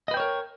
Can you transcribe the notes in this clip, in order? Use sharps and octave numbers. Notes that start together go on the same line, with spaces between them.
A#4 B4 C#5 D#5 G5